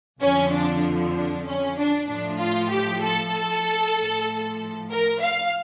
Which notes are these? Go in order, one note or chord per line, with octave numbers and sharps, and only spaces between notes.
F2 D3 F3 C#4
D4
D4
C#4
D4
A2 F3 D4
F4
G4
A4
A2 F3
A#4
F5